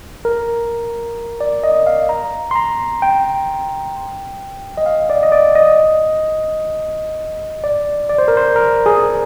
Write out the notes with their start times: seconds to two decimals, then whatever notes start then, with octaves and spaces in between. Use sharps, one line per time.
0.25 A#4
1.41 D5
1.64 D#5
1.87 F5
2.09 A#5
2.51 C6
2.56 A#5
3.02 G5
4.77 D#5
4.86 F5
5.10 D5
5.23 D#5
5.32 D5
5.55 D#5
7.64 D5
8.10 D5
8.18 C5
8.28 A#4
8.37 C5
8.56 A#4
8.86 G#4